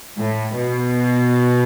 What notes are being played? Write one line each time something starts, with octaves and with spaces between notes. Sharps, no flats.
A2
B2